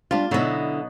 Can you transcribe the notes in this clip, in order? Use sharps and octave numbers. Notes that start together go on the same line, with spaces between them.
G3 D4 F4
B2 D3 F#3 D#4 E4